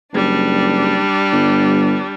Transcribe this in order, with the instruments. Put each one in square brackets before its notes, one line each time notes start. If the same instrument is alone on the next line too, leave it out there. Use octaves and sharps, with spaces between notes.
[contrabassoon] F#1 [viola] G3 D4
[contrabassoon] G1